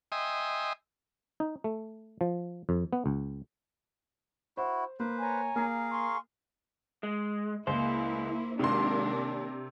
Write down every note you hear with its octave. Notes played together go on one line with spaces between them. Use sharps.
D#5 E5 G5 G#5 C6 D#6
D#4
A3
F3
F2
B3
C#2
E4 F#4 C5
A#3 B4 C5
C#5 G#5 A#5
A#3 G#4 A#4 F5
G#5 C6 C#6
G#3
C#2 A#3 E4 C5
C3 D#3 G#3 A#3 D4 A#4 C6
D#2